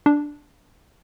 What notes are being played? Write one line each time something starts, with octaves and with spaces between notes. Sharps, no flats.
D4